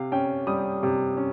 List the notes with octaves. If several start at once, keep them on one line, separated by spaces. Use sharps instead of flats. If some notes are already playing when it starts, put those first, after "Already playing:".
Already playing: C3 F5
C#4 G5
G3 D#6
C3
C#4